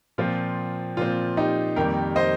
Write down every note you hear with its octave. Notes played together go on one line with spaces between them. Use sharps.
A#2 F3 C4 F4
A#2 F3 C4 F4
D#4 G4
F2 D#3 G3 A#3 G4 A#4
C5 D#5